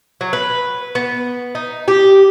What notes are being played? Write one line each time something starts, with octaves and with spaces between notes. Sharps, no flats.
F#3
B4
B3
D#4
G4